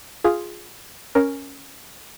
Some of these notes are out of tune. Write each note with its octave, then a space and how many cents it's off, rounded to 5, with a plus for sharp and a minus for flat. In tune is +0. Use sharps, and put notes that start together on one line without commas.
F4 +0 G#4 +0
C#4 +0 A#4 +5